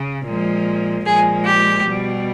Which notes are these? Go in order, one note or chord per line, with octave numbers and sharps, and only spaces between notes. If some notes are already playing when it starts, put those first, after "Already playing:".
Already playing: C#3
A#2 F3 G#3
A#2 F3 G#3 G#4
G4
B2 G3